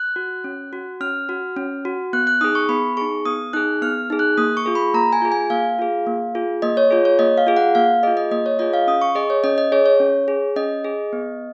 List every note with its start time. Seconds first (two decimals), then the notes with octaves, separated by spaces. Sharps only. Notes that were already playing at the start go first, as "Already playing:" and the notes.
Already playing: F#6
0.16 F#4
0.44 C#4
0.73 F#4
1.01 C#4 F6
1.29 F#4
1.57 C#4
1.85 F#4
2.13 B3 F#6
2.27 F#6
2.41 D#4 G#4 D#6
2.55 C#6
2.69 B3 B5
2.97 D#4 G#4 C#6
3.25 B3 D#6
3.53 D#4 G#4 F#6
3.82 B3 F6
4.10 D#4 G#4
4.19 F#6
4.38 A#3 D#6
4.57 C#6
4.66 F4 G#4
4.75 B5
4.94 A#3 A#5
5.13 G#5
5.22 F4 G#4
5.32 G#5
5.50 A#3 F5
5.79 F4 G#4
6.07 A#3
6.35 F4 G#4
6.62 A#3 D#5
6.77 C#5
6.91 F4 G#4
7.05 C#5
7.19 A#3 D#5
7.38 F5
7.47 F4 G#4
7.57 F#5
7.75 A#3 F5
8.03 F4 G#4 D#5
8.17 D#5
8.32 A#3 D#5
8.46 C#5
8.59 F4 G#4 D#5
8.73 F5
8.87 C#4 D#6
9.02 C#6
9.15 G#4 D#5
9.30 C#5
9.44 C#4 D#5
9.58 D#5
9.72 G#4 C#5
9.86 C#5
10.00 C#4
10.28 G#4
10.56 C#4 D#5
10.84 G#4
11.13 B3